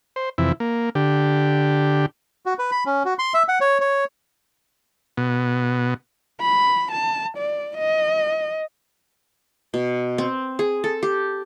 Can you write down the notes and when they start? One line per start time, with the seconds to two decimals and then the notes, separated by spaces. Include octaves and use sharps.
0.16 C5
0.38 F2 C3 E3 E4
0.60 A#3
0.95 D3 G4
2.46 F#4
2.59 B4
2.72 B5
2.86 C#4
3.05 F#4
3.19 C6
3.34 E5
3.48 F#5
3.61 C#5
3.81 C#5
5.17 B2
6.41 B5
6.92 A5
7.38 D5
7.77 D#5
9.74 B2
10.18 C4
10.59 G#4
10.84 A4
11.03 G4